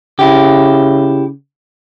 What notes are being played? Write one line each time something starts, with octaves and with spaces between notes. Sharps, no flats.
C#3 E4 G4